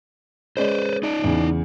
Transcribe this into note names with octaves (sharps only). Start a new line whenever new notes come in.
G#3 C#4 B4 C5 D5
D#4 D5
E2 C#3 E3